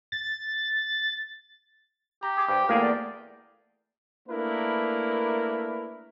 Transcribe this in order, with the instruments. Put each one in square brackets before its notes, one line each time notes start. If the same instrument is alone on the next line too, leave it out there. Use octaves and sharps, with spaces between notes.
[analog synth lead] A6
[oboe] G4 [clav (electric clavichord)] A#5
[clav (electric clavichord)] G#4 [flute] D6
[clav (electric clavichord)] G2 [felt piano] C5 [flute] G5
[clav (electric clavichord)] E2 G#4 A#4 [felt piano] A3 A#3 [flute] F5
[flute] D5
[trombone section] A3 A#3 D4 E4 A#4 B4